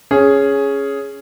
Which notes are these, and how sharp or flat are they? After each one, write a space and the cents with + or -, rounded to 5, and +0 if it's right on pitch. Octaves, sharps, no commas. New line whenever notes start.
C#4 +0 G#4 +5